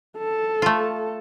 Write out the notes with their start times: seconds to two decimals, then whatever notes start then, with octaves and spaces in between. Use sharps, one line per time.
0.18 A4
0.62 A3 F4